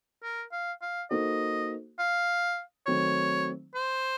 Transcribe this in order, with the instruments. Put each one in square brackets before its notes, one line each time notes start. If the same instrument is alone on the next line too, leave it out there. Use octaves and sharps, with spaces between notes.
[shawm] A#4
F5
F5
[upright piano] A#3 D#4 F#4 A4 C5 [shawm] D#5
[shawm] F5
[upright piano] D#3 F#3 A3 C4 D#4 [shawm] C#5
[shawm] C5